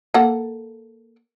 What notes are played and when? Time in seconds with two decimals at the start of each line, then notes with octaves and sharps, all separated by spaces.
0.14 A#3 A4 F#5